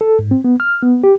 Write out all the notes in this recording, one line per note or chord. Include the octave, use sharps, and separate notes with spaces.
A4
G#2
C4
B3
F6
B3
G4